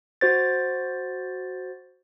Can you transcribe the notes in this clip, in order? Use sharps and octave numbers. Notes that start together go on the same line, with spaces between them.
F#4 C5 A6